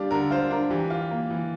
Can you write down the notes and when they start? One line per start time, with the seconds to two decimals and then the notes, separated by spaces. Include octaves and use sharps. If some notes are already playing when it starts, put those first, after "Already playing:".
Already playing: G3 D4 F4 G4
0.11 D3 A#4
0.31 F4 C5
0.50 D4 A#4
0.70 E3 G4
0.90 F4
1.11 A#3
1.30 E3